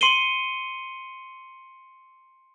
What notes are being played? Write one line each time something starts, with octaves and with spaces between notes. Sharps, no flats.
C6 C7 C#7 D#7 G7